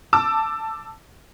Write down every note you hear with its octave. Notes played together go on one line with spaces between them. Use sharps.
A5 D6 E6